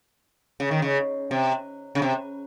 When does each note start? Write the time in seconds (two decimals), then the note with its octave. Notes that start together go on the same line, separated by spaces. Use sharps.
0.60 C#3
0.71 D#3
0.82 C#3
1.31 C3
1.95 C#3
2.02 C3